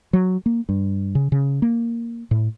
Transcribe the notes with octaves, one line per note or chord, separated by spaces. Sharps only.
F#3
A#3
G2
C#3
C#3
A#3
A2